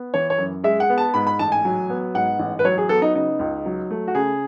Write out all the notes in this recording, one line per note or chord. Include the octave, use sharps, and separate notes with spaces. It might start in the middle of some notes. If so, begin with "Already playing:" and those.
Already playing: B3
E3 C#5
C#5
F#2
G#3 E5
F#5
B3
A5
G#2 B5
B5
A1 A5
G#5
F#3
B3
G#2 F#5
A1
B4
F#3 C#5
G#4
B3 A4
D#4
C#3 D#4
C#2
F#3
A3
F#4
C#3 G#4